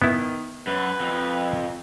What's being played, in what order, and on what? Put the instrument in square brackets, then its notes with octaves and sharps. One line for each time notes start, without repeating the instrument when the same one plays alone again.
[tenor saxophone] D#3 [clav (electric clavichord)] B3 E4
[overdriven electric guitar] F#2 [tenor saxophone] B4
[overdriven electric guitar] F2